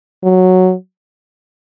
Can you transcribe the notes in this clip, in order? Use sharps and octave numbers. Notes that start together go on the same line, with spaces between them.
F#3